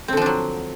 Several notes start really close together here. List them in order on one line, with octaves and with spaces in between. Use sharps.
C4 D3 F3 D4 F#3